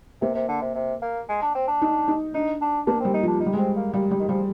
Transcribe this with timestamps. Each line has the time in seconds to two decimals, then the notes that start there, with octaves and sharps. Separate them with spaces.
0.22 C3 A#3
0.35 C3
0.49 D3
0.62 C3
0.75 C3
1.02 A#3
1.29 G#3
1.42 D4
1.55 C4
1.67 D4
1.81 D#4
2.08 D#4
2.34 D4 D#4
2.61 D4
2.87 A#3 D4
3.00 C4
3.05 G3
3.14 D#4
3.23 F3
3.28 D4
3.40 D#4
3.46 G3
3.53 G#3
3.58 C4
3.76 A#3
3.94 G3 A#3
4.11 G3
4.19 D#3
4.28 F3 G3